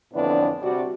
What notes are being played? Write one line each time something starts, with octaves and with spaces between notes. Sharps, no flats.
F2 A2 D3 E3 B3 D4
C3 G3 D4 F#4 D5